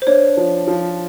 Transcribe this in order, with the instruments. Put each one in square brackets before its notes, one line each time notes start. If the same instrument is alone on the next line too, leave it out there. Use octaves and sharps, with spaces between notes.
[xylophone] C5
[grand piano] D4 [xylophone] C#5
[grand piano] F3
F3